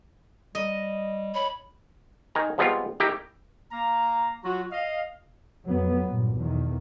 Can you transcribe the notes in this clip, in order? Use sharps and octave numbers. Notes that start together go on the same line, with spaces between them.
G3 D#5
C#5 B5
D#3 G#5 A#5
F3 G3 G#3 B3 C4 F4
D#4 E4 G4 A#4
A#3 F5 A#5
F#3 F4 F#4
D#5 F5
F2 F#3 B3
G2 A#2
B1 E2 D#3